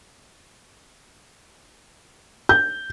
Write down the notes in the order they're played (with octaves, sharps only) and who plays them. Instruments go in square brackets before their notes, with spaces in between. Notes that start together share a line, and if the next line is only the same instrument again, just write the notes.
[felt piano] G6